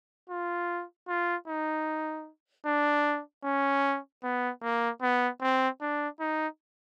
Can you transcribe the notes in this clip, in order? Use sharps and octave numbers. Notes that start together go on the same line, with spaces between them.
F4
F4
D#4
D4
C#4
B3
A#3
B3
C4
D4
D#4